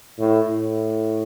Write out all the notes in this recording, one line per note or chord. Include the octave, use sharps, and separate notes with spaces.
A2
A2